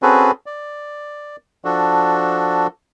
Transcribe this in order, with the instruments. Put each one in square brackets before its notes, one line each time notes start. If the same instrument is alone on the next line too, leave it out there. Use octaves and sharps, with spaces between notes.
[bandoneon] C4 C#4 F#4 G#4 A4 B4
D5
F3 D4 F#4 A4